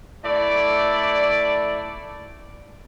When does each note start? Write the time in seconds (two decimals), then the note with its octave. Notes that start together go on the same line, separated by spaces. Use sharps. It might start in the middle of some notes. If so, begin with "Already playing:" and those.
0.25 A3 E4 A4 D5